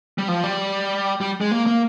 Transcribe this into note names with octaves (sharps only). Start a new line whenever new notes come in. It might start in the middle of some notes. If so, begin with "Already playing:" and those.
G3
F3
G3
G3
G#3
A#3
A#3